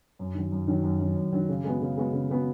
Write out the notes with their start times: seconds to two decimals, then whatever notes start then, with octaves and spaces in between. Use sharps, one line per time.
0.19 F#2
0.35 D#3 F#3
0.52 F#2
0.67 D#3 F#3
0.83 F#2
1.00 D#3 F#3
1.16 F#2
1.33 D#3 F#3
1.49 C#3
1.64 G#3 B3 F#4
1.82 C#3
1.97 G#3 B3 F#4
2.13 C#3
2.29 G#3 B3 F#4